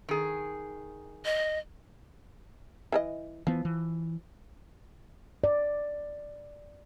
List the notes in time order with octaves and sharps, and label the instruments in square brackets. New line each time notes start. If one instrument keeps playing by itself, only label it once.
[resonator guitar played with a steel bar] D#3 G#4
[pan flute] D#5
[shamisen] E3 A4 D#5
[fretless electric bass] E3 B3 [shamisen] F3
[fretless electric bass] E3
[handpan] D5